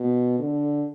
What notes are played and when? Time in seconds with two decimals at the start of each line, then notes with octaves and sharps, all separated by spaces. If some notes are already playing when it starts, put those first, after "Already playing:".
Already playing: B2
0.39 D3